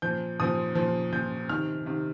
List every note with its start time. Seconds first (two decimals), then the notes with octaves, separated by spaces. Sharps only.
0.02 A#2 F3 G6
0.40 A#2 F3 D#6
0.75 A#2 F3
1.12 A#2 F3 G6
1.49 C3 D#3 F6
1.86 C3 D#3